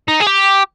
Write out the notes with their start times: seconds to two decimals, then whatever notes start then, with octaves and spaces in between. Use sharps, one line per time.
0.08 D#4
0.20 G#4
0.27 G4